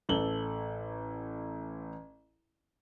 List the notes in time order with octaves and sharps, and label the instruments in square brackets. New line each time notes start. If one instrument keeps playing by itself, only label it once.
[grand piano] A1 A4 F#7 G7